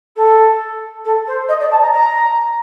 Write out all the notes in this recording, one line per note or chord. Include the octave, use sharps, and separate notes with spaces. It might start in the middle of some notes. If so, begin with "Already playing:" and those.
A4
A4
C5
D#5
D5
A5
A#5
A#5